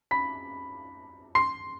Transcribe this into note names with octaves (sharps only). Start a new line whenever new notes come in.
B5 B6
C6 C7